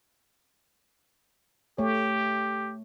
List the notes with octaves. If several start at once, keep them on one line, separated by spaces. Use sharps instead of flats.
A3 G4 C#5